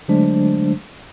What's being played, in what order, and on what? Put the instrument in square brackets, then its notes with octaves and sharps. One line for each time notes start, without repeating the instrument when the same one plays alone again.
[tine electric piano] D3 F#3 G#3 A3 D4 C5